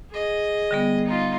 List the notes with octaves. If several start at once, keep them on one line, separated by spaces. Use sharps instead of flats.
G#4 D#5
D3 G3 B3
D#4 F4